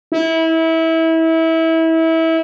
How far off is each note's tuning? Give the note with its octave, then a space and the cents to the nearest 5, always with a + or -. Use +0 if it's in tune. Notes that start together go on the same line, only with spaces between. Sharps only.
E4 -25